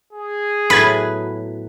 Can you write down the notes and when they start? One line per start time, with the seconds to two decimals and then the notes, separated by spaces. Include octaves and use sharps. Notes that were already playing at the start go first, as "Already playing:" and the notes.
0.13 G#4
0.70 A2 F#3 B3 B4 B5 G#6